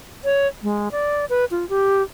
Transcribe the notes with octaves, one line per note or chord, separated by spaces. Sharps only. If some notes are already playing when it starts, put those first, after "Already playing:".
C#5
G#3
D5
B4
F4
G4